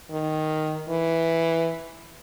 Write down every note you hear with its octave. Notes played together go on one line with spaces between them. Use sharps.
D#3
E3